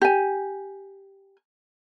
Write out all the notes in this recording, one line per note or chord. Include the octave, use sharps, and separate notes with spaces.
G4 G#5